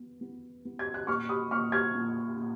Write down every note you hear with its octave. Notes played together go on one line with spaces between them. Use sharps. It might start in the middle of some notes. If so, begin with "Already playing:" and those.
Already playing: B3
B3
B3
G#6
F#6
A#2 C#6 F6
B5 D#6
A#2 C#6 F6
F6 G#6
A#2
A#2